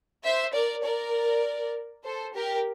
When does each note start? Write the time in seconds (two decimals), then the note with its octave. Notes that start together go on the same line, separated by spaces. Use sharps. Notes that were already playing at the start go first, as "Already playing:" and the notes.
0.24 C5 E5
0.54 A#4 D5
0.84 A#4 D5
2.05 A4 C5
2.35 G4 A#4